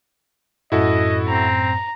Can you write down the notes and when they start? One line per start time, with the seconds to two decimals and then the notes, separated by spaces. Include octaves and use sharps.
0.72 F#2 A2 E4 F#4 A4 D#5
1.27 C4 A#5